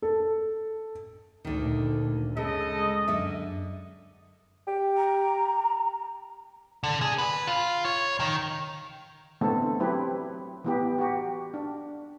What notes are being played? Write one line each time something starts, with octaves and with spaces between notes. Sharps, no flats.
A4
D2 A#2 D3 D#3
C#3 G#3 A4 D#5
F#2 D3 E5
G4
A#5
D3
G#4
B4
F4
C#5
D#3
D3 E3 A3 B3 C4 A4
F#3 C4 E4 G4 B4
E3 B3 G4
F#4 G4
D4